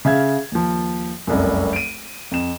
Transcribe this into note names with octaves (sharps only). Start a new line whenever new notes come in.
C#3 E5 F5 G#6
D#2 F3
F1 C2 F#2
D7 D#7
F2 E7